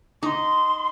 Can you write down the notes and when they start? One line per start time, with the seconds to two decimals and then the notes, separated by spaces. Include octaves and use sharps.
0.22 D#4 C6 D6